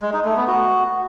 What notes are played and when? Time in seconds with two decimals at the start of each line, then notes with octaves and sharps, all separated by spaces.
0.02 G#3
0.13 D#4
0.25 A3
0.36 B3
0.47 F#4